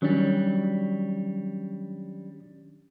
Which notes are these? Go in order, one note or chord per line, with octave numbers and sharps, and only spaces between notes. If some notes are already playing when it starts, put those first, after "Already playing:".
D#3 F#3 G3 C#4 D4